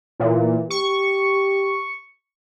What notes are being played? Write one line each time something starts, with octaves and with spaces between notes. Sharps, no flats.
A#2 E3
G4 C#6